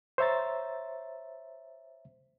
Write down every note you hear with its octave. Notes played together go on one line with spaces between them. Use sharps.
C5 C#5 E5 A#5 A6